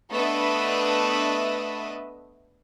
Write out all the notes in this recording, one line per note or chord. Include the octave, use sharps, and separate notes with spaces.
A3 B3 D4 B4 D#5 E5